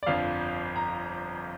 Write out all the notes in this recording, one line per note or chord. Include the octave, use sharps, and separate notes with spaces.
D5
G1 F2 F3 D4 F5
A#5